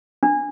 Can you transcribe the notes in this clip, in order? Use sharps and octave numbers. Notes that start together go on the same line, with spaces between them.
D4